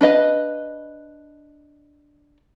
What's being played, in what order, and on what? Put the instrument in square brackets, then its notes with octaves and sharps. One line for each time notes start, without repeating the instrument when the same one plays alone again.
[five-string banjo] D4 B4 D#5 F5